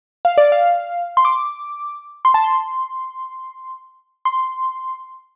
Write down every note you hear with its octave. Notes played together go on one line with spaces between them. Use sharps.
F5
D5
F5
C6
D6
C6
A5
C6
C6